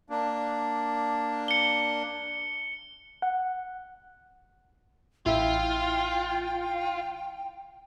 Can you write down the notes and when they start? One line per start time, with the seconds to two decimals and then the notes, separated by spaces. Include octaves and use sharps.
0.10 A#3 D4
1.48 C#7 G7
3.22 F#5
5.26 A1 E4 F4 G5